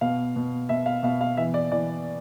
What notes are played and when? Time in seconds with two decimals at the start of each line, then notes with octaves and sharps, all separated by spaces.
0.01 B2 F5
0.36 B2
0.69 B2 E5
0.86 F5
1.03 B2 F5
1.21 F5
1.37 E3 E5
1.54 D5
1.71 E3 D5